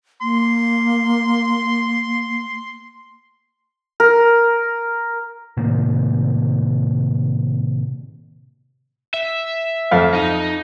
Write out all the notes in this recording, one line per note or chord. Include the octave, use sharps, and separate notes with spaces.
A#3 C6
A#4
A2 C3 D#3 A#3
E5
F2 F5
D#4